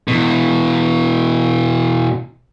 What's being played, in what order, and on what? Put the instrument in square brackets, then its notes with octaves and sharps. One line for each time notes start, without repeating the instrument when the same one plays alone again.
[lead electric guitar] B2 E3